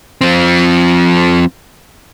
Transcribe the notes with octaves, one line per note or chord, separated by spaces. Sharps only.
F3 C4